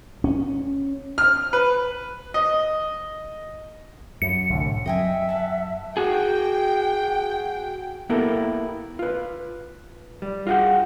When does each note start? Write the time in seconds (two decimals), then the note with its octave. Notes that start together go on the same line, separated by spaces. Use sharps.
0.24 C#4
1.18 F6
1.53 B4
2.34 D#5
4.22 F#2 C#7
4.50 C2 A2 D3
4.86 F#2 D#5 E5 G5 G#5
5.29 F#5 A5
5.97 F#4 G#4 G5
8.09 A#3 B3 E4 G4 A4 A#4
8.99 F4 B4
10.22 G3
10.47 F4 F#4 G#4 F#5 G5